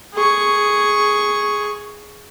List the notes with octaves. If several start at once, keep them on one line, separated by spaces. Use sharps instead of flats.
G#4 C#6